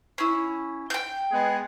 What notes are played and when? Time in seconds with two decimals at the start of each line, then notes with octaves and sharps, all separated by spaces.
0.18 C#4 E4
0.90 G5 G6
1.32 G#3 B3 G#4